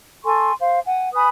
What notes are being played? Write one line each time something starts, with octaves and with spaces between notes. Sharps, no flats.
A4 G#5 C6 C#6
C5 F5
F#5 G#5
B4 G#5 B5 D#6